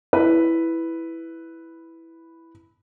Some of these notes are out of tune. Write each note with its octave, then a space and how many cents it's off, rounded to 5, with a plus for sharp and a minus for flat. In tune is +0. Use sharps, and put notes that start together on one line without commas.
E4 +0 B4 +0